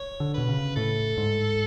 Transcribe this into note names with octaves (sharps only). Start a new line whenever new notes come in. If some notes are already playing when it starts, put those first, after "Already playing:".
Already playing: C#5
D3
B2 B4
C#3
A2 A4
G#2